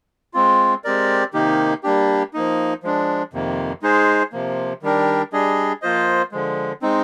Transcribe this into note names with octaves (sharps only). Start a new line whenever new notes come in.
G#3 C4 F4
G#3 C4 G4 A#4 D5
C3 D#3 A#3 D#4 G4
G3 A#3 D4 G4
F3 A#3 D#4
F3 G#3 D4
F2 C3 D#3 A#3
G#3 D#4 G#4 C5
C3 F3 A#3
D#3 G3 D4 G4 A#4
G3 D4 G#4 D#5
F3 A#3 F4 C5 D#5
D3 F3 G#3
G#3 C4 D#4